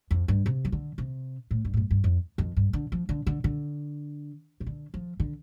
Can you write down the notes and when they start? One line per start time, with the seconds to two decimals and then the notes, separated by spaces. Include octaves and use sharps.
0.11 F2
0.28 G2
0.46 C3
0.65 F3
0.72 D3
0.98 C3
1.51 A2
1.65 G2
1.74 A2
1.77 G2
1.91 G2
2.04 F2
2.38 F2
2.57 G2
2.73 D3
2.92 F3
3.09 D3
3.27 D3
3.44 D3
4.60 C3
4.67 D3
4.94 F3
5.20 D3